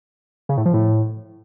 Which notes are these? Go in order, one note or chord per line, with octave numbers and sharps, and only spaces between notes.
C#3
A2
F3
A2